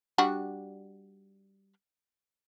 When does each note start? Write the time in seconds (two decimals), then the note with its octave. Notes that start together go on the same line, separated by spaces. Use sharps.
0.18 G3 D4 F#4